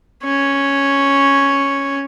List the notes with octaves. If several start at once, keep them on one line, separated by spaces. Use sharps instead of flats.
C#4 C#5